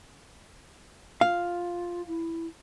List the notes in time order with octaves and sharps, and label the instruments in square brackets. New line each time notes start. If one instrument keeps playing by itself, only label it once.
[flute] F4 [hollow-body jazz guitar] F5
[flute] E4